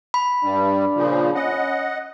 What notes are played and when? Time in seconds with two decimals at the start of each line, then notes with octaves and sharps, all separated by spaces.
0.14 B5
0.44 G2 G3 D4
0.96 A#2 C#3 F3
1.35 C#4 D#5 F#5